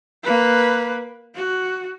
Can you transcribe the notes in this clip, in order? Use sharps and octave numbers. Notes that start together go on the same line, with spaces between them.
A#3 B4
F#4